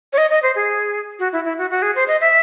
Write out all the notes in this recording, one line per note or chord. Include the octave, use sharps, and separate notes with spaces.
C#5
D#5
D#5
C5
G#4
F#4
E4
E4
F#4
F#4
G#4
C5
D#5
E5